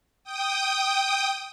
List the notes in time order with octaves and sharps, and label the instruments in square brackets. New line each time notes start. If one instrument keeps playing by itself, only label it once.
[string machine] G5 D#6